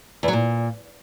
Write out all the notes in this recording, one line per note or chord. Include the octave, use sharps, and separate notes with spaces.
E2
F#3
A#2